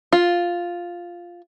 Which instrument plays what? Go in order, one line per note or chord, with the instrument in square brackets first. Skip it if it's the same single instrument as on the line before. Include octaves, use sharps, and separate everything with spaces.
[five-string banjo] F4